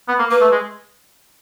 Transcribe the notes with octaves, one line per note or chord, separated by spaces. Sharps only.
B3
A#3
A#3 B4
A3
G#3